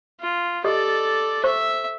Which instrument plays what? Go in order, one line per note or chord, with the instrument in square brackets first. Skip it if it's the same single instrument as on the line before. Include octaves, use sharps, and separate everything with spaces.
[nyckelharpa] F4
[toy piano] G4 D#5 D#6 [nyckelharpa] A4 D5
[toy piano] C5 C#6 [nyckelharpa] E5